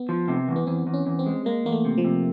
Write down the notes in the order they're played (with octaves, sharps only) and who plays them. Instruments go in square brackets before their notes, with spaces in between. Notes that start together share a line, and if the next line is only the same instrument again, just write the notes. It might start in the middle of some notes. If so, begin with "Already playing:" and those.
Already playing: [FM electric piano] B3
[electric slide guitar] F3
C3
E2
[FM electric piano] B3
[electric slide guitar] E2 [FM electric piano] C4
[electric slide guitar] E2
[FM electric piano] C#4
[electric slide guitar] E2
[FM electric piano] C4
[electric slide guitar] G#3
[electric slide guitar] G#3 [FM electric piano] A#3
[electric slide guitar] E2 [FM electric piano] A#3
[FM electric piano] A3
[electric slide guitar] C3
[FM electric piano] F3
[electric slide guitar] C3